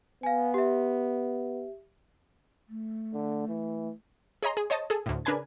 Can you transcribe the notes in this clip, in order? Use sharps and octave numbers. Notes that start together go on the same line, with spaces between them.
B3 F5 G#5
G4 E5
A3
D3
E3
G#4 C#5 D#5 A#5 C6
G#4
C5 C#5 D#5 A5
G#4 A4
D2 A2
C#3 D4 A#4 B4 G#5 G#6